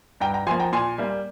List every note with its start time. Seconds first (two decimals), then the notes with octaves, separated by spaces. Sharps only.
0.20 G2 G5 A#5
0.34 G5 A#5
0.47 F3 G#5 C6
0.51 A#3
0.59 G5 A#5
0.72 A#2 G#5 C6
0.98 G3 A#3